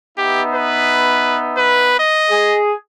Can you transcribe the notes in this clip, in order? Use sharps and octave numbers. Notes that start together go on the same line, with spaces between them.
B3 D#4 G4 E5
B4
B4
D#5
G#4